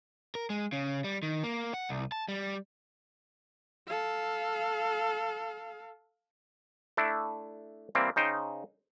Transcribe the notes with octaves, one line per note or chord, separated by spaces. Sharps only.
A#4
G#3
C#3
G3
D#3
A#3
F#5
C2
A5
G3
A4 F5
A3 D4 E4
E3 G3 A#3 C4
C#3 D#4 C5 G5